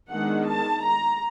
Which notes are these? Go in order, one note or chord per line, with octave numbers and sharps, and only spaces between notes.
D#3 G#3 B3 D4 F#5
A5
A#5